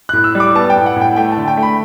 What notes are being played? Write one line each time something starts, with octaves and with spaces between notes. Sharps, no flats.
A2 F#6
E6
G3
D6
B3 A5
G5
A2
F#5
A2
G5
A3 G5
D3 A5
G5
A3
B5